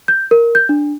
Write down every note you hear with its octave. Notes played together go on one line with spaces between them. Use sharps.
G6
A#4
G6
D4